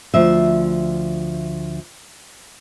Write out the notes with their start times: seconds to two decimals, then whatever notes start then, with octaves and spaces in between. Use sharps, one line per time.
0.14 D2 F3 E5